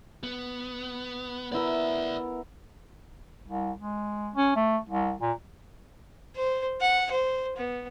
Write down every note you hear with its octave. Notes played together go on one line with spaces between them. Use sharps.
B3
B3 E4 A#4 D5 E5
C2
G#3
C#4
A3
C2
A#2
C5
F#5
C5
B3